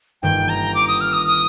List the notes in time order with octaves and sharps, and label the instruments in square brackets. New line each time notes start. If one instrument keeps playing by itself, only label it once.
[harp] G1 G2 D#3 A#3 [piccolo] G5
[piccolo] A#5
D6
D#6
F6
D#6
D#6